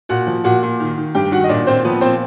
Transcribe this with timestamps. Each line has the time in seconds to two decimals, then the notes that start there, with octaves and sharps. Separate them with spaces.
0.09 A#2 F#4 F#5
0.27 F3
0.44 A#2 F#4 F#5
0.63 A#2
0.80 D#3
0.98 D#3
1.15 G2 G4 G5
1.31 D#3 F#4 F#5
1.44 D#5
1.49 A#2 D4 D5
1.66 A#2 C4 C5
1.85 F3 B3 B4
2.01 A#2 C4 C5